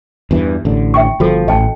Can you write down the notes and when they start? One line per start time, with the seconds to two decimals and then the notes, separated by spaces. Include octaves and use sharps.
0.31 E2 G2 E3
0.65 A1 D3
0.94 E5 G5 C#6
1.20 G1 F3 F#4 A4
1.48 A1 D#5 G5 A5